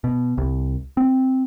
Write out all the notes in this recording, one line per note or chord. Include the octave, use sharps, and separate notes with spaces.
B2
C2
C4